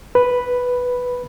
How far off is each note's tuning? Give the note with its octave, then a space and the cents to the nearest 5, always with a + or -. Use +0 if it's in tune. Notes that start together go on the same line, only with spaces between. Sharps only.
B4 +0 B5 +0